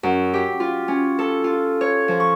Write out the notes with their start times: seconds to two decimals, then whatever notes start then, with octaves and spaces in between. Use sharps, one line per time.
0.03 F#2
0.34 G4
0.60 F4
0.88 C#4
1.19 A4
1.44 F4
1.81 C#5
2.08 F3
2.20 C#6